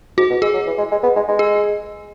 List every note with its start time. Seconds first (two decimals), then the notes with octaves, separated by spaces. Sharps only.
0.17 G#2 F#4
0.30 B2
0.42 G#3 G#4
0.54 F#3
0.66 E3
0.78 G#3
0.91 G#3
1.03 B3
1.16 G#3
1.28 G#3
1.39 G#4